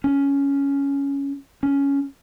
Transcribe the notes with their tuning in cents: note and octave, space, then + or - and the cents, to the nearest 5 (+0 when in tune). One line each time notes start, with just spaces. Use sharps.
C#4 +10
C#4 +10